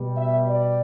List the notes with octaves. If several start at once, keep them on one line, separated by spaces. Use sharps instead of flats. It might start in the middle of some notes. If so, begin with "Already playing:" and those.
Already playing: B2 G3
E5
D5